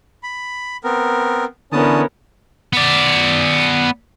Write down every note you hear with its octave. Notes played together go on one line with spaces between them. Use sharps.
B5
B3 C4 A#4
D3 E3 B3 C#4 A#4 A5 D#6
B3 D5